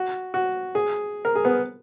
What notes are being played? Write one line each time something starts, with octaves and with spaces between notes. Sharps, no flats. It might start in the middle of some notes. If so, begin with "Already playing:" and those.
Already playing: F#4
F#4
G#4
A#4
G#4
B3